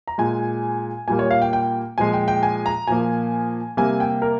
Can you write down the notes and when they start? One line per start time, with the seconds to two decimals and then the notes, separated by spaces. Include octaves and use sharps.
0.08 A#5
0.18 A#2 G#3 G#5
1.08 A#2 G3 A#3 G#5
1.19 C#5
1.31 F5
1.42 G5
1.53 G5
1.98 A#2 F3 G#3 G#5
2.13 G5
2.28 G5
2.43 G#5
2.66 A#5
2.87 A#2 F3 A#3 G#5
3.77 C3 G3 A#3 G#5
4.00 G5
4.22 A#4